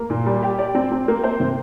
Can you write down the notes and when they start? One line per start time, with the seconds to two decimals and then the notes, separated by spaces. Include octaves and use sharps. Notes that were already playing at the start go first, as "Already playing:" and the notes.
Already playing: A#3
0.10 A#2
0.26 G3
0.43 G4
0.58 D5
0.75 C4
0.92 C4
1.08 A#3
1.24 C5
1.40 C3